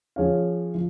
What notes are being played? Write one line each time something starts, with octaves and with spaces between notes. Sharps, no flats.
F3 C#4 G#4 C#5 F5
F3